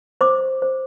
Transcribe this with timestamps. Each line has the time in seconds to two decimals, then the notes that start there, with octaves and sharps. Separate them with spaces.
0.21 C5 D6
0.62 C5